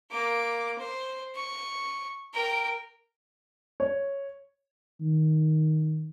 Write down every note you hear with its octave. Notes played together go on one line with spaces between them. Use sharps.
A#3 D6
C5
C#6
A#4 G5
C#5
D#3